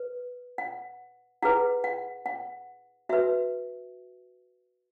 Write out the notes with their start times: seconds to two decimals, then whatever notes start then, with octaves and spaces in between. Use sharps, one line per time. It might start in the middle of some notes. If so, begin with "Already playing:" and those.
Already playing: B4
0.58 F#5
1.42 E4 G#4 B4 F#5
1.84 F#5
2.26 F#5
3.09 F#4 B4 E5